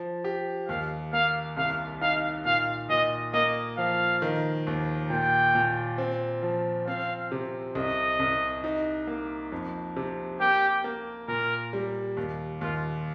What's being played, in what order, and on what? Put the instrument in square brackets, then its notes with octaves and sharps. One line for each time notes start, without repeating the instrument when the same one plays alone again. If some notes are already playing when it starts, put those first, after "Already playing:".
Already playing: [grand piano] F3
G4
[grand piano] D#2 [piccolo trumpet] F5
[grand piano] A#3 [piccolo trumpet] F5
[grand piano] C2 [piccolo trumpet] F5
[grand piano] D#4 [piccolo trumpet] F5
[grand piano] A#2 [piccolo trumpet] F5
[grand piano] A#2 [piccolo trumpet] D#5
[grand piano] A#3 [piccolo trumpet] D#5
[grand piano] F3 [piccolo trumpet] F5
[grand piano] D#3
D#2
[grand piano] A#2 [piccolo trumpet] G5
[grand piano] A#2
C4
F3
[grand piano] C4 [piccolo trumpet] F5
[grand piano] C3
[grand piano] C2 [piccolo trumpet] D#5
[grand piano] C2
D#4
A#3
F2
C3
[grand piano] A#3 [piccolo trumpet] G4
[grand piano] A#3
[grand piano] A#2 [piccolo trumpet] A#4
[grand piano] G3
D#2
[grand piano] D#2 [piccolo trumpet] F4